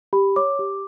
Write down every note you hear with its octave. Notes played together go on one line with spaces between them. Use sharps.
G4 B5
C#5 D6
G4